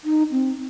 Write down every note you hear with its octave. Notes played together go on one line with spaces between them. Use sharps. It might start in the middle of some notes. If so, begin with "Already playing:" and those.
D#4
C4